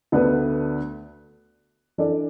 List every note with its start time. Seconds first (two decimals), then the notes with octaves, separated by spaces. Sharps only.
0.12 D2 D3 B3 D4 B4
1.98 E3 D4 A4 D5